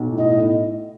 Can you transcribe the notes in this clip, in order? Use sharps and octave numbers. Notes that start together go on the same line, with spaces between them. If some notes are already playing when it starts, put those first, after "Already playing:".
Already playing: B1
A2
D#5
A2